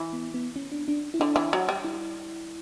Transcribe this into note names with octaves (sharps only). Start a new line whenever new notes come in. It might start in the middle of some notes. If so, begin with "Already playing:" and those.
Already playing: E3
B3
B3
C#4
D4
D4
E4
D3 D4
E3
F#3
G3
E4